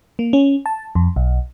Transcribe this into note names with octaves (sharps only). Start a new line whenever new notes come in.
A#3
C#4
A5
F2
B1